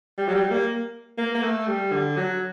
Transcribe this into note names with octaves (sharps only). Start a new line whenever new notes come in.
G3
F#3
G3
A#3
A#3
A#3
A3
G3
D3
F#3